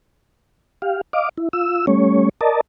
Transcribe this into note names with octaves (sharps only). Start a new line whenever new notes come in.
G4 F5
D#5 F5 D6
E4
F4 E6
G3 A3 C#4 C#5
A#4 D5 D#5 A5